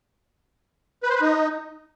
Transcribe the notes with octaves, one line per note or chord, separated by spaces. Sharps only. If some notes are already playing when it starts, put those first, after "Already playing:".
B4
C5
B4
D#4